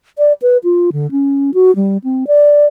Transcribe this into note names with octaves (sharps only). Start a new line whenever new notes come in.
D5
B4
F4
D3
C#4
F#4
G3
C4
D5